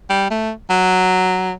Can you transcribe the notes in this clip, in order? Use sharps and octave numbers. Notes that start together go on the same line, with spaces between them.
G3
A3
F#3